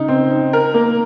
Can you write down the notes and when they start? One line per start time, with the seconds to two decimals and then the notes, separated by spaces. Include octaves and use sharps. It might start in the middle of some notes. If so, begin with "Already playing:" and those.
Already playing: C#3 D#4
0.08 C4
0.31 D#4
0.53 A#4
0.74 A#3